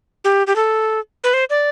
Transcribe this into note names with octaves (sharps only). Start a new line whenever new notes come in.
G4
G4
A4
B4
C5
D5